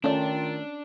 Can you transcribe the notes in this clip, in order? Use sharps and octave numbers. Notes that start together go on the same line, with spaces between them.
D#3 A3 C#4 D4 F4 D5